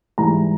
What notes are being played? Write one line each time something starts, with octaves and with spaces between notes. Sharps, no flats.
G#2 E3 G3 A#5